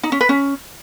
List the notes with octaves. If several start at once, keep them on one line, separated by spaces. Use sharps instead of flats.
D#4
C#4
B4
C#4